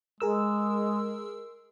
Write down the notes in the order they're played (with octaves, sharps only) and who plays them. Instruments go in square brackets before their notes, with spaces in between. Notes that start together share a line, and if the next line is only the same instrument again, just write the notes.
[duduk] G#3 [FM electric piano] G#4 A#4 E6